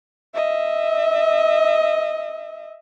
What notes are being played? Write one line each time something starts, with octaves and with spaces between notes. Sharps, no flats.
D#5 E5